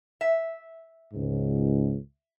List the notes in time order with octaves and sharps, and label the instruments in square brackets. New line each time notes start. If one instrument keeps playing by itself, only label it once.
[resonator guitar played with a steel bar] E5
[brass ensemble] C#2 G#2